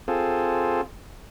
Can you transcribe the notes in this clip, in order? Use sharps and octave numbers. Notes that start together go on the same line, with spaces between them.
C4 F4 G#4 A4